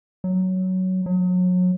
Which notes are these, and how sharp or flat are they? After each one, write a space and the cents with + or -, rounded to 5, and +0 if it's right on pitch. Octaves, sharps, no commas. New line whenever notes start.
F#3 +10
F#3 -30